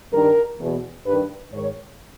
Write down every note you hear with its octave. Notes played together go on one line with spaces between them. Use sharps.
G2 D#3 A#4
E2 B2
G2 D#3 B4
G#2 D#3 C#5